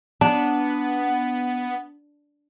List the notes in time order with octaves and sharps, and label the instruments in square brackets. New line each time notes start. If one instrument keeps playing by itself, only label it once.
[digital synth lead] B3 [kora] D4